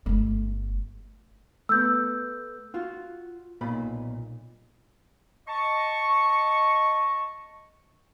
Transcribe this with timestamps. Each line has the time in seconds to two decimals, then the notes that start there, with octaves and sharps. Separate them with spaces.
0.06 G1 A3
1.69 A3 B3 E6 G6
2.74 F4 F#4
3.61 B1 A#2 B5
5.48 D#5 A5 C#6